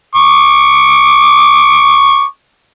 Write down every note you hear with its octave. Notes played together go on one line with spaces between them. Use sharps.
C#6 D6